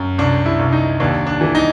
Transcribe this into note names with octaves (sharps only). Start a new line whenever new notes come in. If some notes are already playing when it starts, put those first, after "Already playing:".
Already playing: F#2
C2 D4
E4
C2
D#4
D#2 D4
D4
E3
D#4